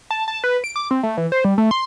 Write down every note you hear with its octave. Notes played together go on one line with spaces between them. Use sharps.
A5
A5
B4
D7
D6
C4
A3
E3
C5
G3
A3
C6